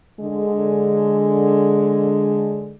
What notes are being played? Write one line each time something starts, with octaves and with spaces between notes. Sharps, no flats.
D3 G#3